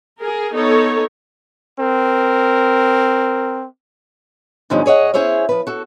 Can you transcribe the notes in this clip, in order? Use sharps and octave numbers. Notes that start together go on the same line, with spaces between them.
G#4 A#4
B3 D#4 A4 C#5
C4 A#4
E2 G2 D3 F3 C#4 D#4
G#4 C#5 D#5 F#5
C#4 E4 G#4 C5 C#5 E5
F3 B4
F#4 A4